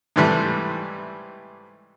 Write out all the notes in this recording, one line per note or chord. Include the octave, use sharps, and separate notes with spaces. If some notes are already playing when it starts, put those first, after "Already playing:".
G#2 C3 E3 G3 A3